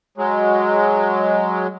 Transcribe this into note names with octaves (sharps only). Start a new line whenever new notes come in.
F#3 G#3